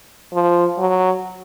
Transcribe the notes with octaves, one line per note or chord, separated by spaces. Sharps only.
F3
F#3